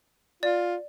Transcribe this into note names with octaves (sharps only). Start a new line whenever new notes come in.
F4 D5